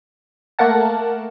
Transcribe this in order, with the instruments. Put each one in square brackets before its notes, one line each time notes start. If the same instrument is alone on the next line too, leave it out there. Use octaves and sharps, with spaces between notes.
[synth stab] A3 A#3 A#4 F#5 A5